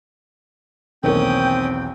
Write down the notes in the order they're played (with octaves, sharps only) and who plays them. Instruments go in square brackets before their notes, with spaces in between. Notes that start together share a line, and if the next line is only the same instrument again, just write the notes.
[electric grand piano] B1 E2 [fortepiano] D#3 A#3 [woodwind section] C4 G5 [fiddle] C#4 D#6